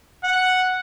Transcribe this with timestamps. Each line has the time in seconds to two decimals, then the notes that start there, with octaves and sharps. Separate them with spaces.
0.24 F#5